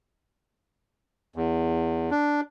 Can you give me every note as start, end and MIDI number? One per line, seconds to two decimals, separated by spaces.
1.36 2.10 40
2.11 2.41 62